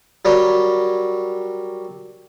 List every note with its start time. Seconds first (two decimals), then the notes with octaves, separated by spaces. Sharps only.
0.25 F#3 G3 A#4 C#5